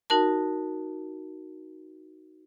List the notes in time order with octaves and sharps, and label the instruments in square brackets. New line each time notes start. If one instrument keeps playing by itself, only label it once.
[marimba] D#4 F#4 A#4 A5